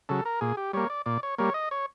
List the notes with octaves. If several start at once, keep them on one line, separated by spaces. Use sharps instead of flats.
C#3 F#3 A4
A#4
A#2 G#4
G4
G3 A#3 C#5
D5
A#2 D5
C#5
G3 A#3 C#5
D#5
C#5